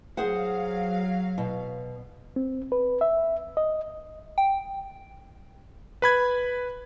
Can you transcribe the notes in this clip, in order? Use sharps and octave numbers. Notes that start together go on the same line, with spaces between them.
F#3 G#4 C5 F5 F#5
B2
C4
B4
E5
D#5
G5
B4 B5 G#6